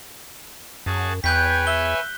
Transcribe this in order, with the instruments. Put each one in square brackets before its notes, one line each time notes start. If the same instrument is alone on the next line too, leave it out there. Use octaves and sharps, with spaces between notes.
[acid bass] F#2 [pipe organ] F#4 G#4 A5
[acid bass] E2 [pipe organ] B4 C#5 G#5 [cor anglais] G5 [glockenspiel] F#6 G6 B6
[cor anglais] E5 [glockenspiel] G7